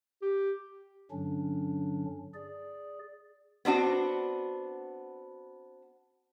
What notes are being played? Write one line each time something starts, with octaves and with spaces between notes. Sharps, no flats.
G4
G2 D3 F#3 C#4 D4
G#4 D5
B3 C4 D4 F#4